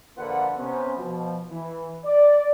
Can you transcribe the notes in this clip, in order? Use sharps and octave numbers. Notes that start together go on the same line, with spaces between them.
A#1 D3 A#3 F4 B4 F#5
C3 B3 C#4 C5
B2 F3
E3
D5